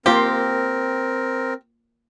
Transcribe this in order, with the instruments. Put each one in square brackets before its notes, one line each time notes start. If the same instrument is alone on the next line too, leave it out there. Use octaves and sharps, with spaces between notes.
[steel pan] A#3 F4 C5 [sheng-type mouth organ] C4 A#4 [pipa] G4